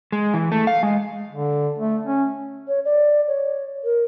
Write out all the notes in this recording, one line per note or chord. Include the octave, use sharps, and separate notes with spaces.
G#3
E3
A3
F5
G#3
D3
A3
C#4
C#5
D5
C#5
A#4